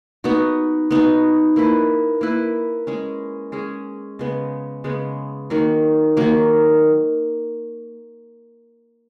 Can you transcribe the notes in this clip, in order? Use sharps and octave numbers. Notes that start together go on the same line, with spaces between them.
B3 D#4 F#4
B3 D#4 F#4
A#3 E4 B4
A#3 E4 B4
G#3 C#4 G#4
G#3 C#4 G#4
C#3 G#3 B3
C#3 G#3 B3
D#3 F#3 A#3
D#3 F#3 A#3